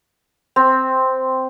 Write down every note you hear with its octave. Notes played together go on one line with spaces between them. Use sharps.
C4